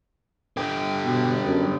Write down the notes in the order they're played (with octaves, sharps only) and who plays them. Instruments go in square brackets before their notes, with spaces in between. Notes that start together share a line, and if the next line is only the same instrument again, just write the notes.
[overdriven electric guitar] D3 G4
[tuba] B2
F#2